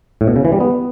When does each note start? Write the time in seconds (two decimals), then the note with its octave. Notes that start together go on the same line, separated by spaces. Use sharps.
0.21 A2
0.27 B2
0.36 C#3
0.45 E3
0.52 G3
0.60 B3